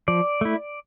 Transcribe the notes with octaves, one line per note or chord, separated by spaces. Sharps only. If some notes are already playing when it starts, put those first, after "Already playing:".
F3 D5
A3 E4